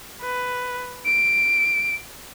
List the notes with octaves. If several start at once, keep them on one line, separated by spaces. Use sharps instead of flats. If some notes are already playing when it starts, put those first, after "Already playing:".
B4
D7